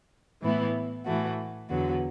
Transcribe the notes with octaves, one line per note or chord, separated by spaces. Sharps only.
A2 E3 B3 E4
A2 E3 A3 F#4
E2 D3 F#3 B3 F#4